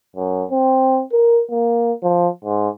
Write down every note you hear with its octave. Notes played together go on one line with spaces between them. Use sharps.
F#2
C4
A#4
A#3
F3
G#2